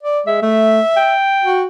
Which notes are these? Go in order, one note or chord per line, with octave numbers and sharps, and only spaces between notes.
D5
G#3 E5
A3 E5
G5
F#4